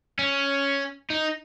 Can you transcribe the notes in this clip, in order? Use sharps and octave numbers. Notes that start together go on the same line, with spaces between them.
C#4
D#4